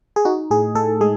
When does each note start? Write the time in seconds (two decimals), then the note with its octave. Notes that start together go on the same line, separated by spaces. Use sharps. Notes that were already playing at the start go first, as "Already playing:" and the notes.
0.16 G#4
0.25 D#4 F#4
0.51 A2 G#4
0.75 A2 A4
1.01 G#3 G#4